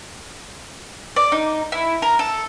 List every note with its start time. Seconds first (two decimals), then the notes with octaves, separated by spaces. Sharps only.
1.16 D5
1.32 D#4
1.72 E4
2.02 A#4
2.19 A4